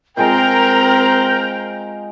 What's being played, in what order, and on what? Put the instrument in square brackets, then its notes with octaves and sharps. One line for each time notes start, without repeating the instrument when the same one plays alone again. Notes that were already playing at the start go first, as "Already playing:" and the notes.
[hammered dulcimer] G#3 F4 F5 [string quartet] C4 [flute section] A#4 A#5 [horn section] G5